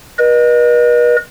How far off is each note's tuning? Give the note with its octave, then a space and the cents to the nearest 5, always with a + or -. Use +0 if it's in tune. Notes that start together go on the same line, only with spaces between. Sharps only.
B4 -45 D#5 -30